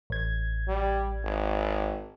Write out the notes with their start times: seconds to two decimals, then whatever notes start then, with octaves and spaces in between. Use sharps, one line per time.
0.10 A1 G#6
0.68 G3
1.24 G#1